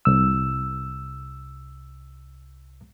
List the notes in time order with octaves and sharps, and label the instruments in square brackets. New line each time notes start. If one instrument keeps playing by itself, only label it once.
[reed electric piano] C2 E6